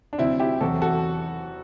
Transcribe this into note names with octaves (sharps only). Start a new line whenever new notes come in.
D4
D2 C3 F#3 C4 E4
E4 G4
E2 C3 F#3 F#4 A4
F#4 A4